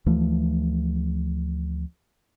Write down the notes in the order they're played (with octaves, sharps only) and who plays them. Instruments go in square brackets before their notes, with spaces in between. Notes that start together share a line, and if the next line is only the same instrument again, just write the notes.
[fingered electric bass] D2 E3 F3 A3